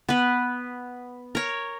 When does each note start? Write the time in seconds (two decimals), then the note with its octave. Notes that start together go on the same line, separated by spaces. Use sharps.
0.09 B3 B4
1.35 A#4 C#5